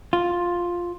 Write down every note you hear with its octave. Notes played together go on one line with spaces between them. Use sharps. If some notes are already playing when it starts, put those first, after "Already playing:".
F4